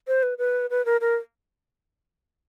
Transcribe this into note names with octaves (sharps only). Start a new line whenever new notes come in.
C5
B4
B4
B4
A#4
A#4